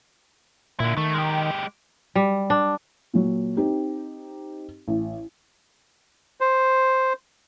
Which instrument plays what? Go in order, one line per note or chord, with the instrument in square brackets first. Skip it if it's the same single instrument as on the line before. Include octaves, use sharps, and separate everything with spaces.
[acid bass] A#2 [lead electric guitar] D3 E4
[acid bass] D#3 [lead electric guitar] A3
[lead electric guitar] G#3 G4
[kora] G3
D4
[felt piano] A#2 F#3
C4 D#4 G4
A1
[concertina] C5